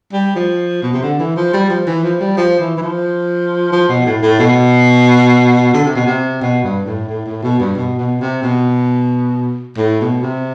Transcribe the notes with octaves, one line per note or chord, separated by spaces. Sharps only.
G3
F3
B2
C3
D3
E3
F3
G3
F3
E3
F3
G3
F3
E3
E3
F3
F3
B2
A2
A2
B2
D3
C3
B2
C3
B2
G2
A2
A2
A2
B2
G2
B2
B2
C3
B2
A2
B2
C3